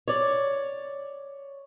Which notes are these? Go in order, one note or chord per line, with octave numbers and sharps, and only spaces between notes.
C#5 D5